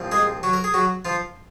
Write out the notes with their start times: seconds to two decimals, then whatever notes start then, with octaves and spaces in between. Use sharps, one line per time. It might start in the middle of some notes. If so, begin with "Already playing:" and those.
Already playing: C2 A#2 F3 C4
0.12 G#3 G#4
0.43 F#3 F#4
0.53 A#4
0.64 G#4
0.74 F#3 F#4
1.05 F3 F4